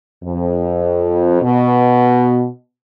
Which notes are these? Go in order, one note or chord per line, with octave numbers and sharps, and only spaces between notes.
F2
B2